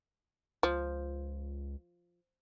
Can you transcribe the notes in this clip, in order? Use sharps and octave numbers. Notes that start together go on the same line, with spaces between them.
C#2 F3